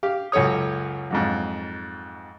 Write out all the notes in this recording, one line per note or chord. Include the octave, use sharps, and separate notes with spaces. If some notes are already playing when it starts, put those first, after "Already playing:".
G4 F5
C#2 F#2 A4 C#5 D#6
F2 G#2 F#3